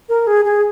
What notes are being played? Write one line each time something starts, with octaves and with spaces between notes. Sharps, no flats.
A#4
G#4
G#4